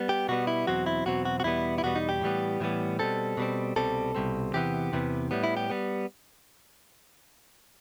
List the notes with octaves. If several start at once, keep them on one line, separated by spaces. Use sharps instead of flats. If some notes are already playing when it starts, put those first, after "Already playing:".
Already playing: G3 B3
G4
B2 G3 B3 F#4
E4
E2 B2 F#3 C4 F#4
E4
E2 B2 F#3 C4 F#4
F#4
F#4
E2 B2 G3 B3 E4
E4
E2 B2 G3 B3 F#4
D#4
G4
A2 E3 G3 B3
A2 E3 G3 B3
B2 G3 C4 A4
B2 G3 C4
C2 B2 G3 C4 A4
C2 B2 G3 C4
E2 C3 E3 B3 G4
E2 C3 E3 B3
A2 G3 B3
E4
G4
G3 B3